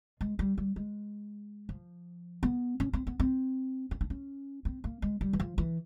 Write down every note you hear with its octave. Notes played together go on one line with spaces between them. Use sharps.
G#3
G3
G3
G#3
F3
B3
C#4
C4
B3
C4
C#4
D4
C#4
C4
A#3
G#3
G3
E3
F3
E3